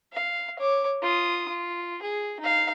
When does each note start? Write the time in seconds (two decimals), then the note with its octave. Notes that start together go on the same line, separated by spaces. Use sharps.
0.13 F5
0.59 C#5 D6
1.02 F4 D#6
1.48 F4
2.02 G#4
2.40 D#4 F5